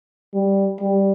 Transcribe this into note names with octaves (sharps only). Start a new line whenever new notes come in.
G3
G3